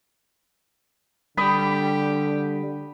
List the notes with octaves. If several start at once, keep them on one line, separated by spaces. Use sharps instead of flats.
D3 G3 G4 B5 D#6